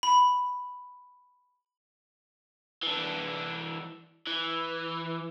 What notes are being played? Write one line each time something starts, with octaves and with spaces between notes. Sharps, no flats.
B5
E3 D4
E3